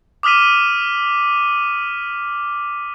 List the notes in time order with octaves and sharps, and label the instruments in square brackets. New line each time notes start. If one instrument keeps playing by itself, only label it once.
[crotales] D6 D#6 F6 B6 D#7